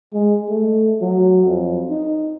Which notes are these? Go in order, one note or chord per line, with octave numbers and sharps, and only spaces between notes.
G#3
A3
F#3
F2
D#4